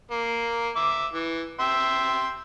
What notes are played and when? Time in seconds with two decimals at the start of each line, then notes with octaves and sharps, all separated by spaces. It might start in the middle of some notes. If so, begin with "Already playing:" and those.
0.11 A#3
0.76 E5 D6
1.13 E3
1.60 E5 G5 C6